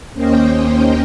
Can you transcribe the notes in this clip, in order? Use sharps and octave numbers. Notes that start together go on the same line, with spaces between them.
D#2 A#3 C#4 C5 D#5 G5